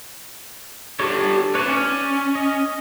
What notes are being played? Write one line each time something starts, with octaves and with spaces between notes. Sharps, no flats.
D4 G4 A4 C#5
B4 C#5 D5 A5
C#4
D#5